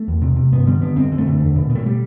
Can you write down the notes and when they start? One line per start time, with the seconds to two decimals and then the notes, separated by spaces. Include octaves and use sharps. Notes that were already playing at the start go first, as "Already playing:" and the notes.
Already playing: A3
0.08 E2
0.22 C3
0.37 C3
0.52 G2 B3
0.67 D3 G3
0.81 D3 B3
0.96 F#2 C4
1.12 D3
1.18 A3
1.27 D3
1.40 E2
1.56 B2
1.70 B2
1.75 A3
1.86 G3